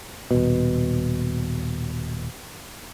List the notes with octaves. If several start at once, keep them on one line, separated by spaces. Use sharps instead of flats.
D#1 B2